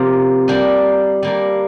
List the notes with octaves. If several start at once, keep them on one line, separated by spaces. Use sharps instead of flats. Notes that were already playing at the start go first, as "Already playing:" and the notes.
Already playing: C3 F3 A#3
G3 A#3 D4 G4
G3 A#3 D4